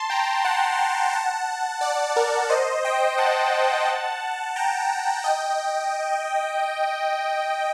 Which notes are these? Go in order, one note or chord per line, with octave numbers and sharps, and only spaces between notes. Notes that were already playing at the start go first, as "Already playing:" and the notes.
Already playing: A5 C6
G5 A#5
F#5 A5
F#5 A5
D5 F#5
A#4 D5
C5 D#5
D#5 G5
F#5 A5
G5 A#5
D#5 G5